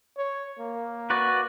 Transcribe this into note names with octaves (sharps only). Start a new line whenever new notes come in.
C#5
A#3
F#4 B4 D5